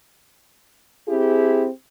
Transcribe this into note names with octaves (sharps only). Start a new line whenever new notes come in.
C4 E4 G4 G#4